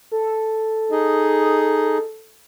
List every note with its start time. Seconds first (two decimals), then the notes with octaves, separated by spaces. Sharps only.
0.12 A4
0.91 D#4 G#4 D#5